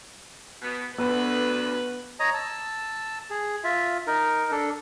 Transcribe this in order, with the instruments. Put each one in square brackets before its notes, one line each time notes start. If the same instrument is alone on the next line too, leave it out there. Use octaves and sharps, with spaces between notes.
[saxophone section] B2 B3
[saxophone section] D2 [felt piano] B3 [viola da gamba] B4
[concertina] C#5 D#5 A#5 D#6
A5 E6
G#4
F4 E5
D#4 A#4
D4 A4